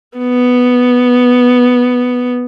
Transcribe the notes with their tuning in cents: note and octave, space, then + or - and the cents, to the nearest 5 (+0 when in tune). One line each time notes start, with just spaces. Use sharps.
B3 +0